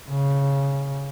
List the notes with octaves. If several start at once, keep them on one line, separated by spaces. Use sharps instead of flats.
C#3